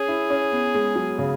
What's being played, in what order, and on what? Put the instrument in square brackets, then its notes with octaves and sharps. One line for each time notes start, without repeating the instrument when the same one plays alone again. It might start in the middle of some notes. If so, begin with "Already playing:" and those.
Already playing: [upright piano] C#4 [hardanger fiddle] G#4
[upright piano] E4
C#4
B3
G#3
F#3
C#3